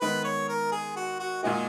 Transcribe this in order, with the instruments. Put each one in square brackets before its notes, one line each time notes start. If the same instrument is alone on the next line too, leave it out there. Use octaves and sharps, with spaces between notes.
[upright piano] D#3 G#3 B3 [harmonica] B4
[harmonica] C#5
A#4
G#4
F#4
F#4
[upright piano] A#2 G#3 D#4 F#4 [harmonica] G#4